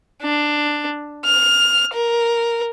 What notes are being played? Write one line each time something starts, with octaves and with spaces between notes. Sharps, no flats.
D4
F6
A#4